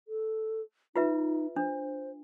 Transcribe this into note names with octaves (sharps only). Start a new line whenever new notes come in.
A4
D#4 F4 B4 E5
D4 C5